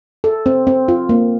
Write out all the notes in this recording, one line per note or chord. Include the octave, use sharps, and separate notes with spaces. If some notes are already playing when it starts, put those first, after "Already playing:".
A4
C4
C4
F4
A#3